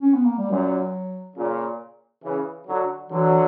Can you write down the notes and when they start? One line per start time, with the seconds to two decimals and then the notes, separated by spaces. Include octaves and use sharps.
0.02 C#4
0.14 B3
0.25 A#3
0.38 G3
0.49 F#2 A#2 F#3
1.36 A#2 C#3
2.23 C#3 E3
2.67 D3 F#3
3.10 D3 E3 F#3